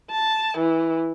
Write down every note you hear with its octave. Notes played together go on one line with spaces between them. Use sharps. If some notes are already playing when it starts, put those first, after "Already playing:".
A5
E3